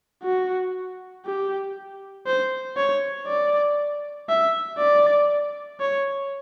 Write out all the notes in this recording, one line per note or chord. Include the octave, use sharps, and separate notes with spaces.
F#4
G4
C5
C#5
D5
E5
D5
C#5